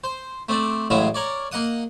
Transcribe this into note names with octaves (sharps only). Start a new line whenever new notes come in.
C5
A3 C4 D5
A1 A2 F#3 G#3 E5 F5
A#4 C#5 D5
A#3 D#5 F#5 D#6